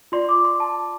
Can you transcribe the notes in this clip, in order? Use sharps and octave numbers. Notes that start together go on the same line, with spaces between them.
F4 D5 C6
D6
C6
A5